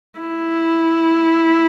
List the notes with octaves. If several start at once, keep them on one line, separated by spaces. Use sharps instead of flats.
E4